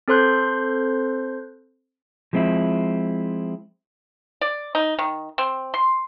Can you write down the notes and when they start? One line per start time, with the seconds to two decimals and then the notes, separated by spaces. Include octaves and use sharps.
0.08 C4 A4 C5 C6 F#6 G6
2.33 F3 G#3 C4 D4 E4
4.41 D5
4.75 D#4
4.99 D#3
5.38 C4
5.74 C6